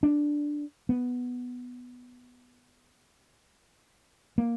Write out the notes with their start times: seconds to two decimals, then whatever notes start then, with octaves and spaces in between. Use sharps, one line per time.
0.03 D4
0.89 B3
4.38 A#3